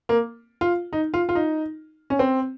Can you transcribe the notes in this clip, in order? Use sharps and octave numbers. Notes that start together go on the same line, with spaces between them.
A#3
F4
D#4
F4
F4
D#4
C#4
C4